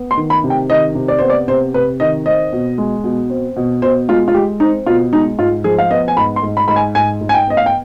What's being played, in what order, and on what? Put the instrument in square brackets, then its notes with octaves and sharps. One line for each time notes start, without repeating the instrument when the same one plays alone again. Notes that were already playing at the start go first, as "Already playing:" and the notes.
Already playing: [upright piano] B3
C6
D#3
B5
C3
G5
D#3 D#5
C3
D5
B3 C5
D5
C3 C5
C3 B4
D#3 D#5
C4 D#5
B2
G#3
B2
C4
B2
B2 C5
G#3 F4
F4
G#3 G4
C4 D#4
B2 F4
G#3 D#4
G#2 F4
F3 G#4
F5
B3 D#5
G#5
G#2 B5
C6
G#2
B5
G#2 B5
G#5
G#2 G#5
G#2
G#5
G5
B3 D#5
F5
G5